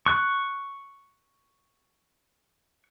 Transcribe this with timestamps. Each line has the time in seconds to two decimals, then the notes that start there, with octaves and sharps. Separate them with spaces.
0.06 C#6 F#6